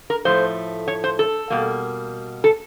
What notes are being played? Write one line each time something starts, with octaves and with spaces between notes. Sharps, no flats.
A#4
A2 F3 A3 C5
C#5
C5
A4
B2 G3 A#3
A4